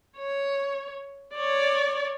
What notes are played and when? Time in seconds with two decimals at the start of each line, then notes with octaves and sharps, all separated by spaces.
0.18 C#5
1.35 C#5 D5